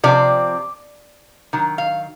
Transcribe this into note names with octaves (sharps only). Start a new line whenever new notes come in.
C3 F3 C4 D5
D#3 F#3
F5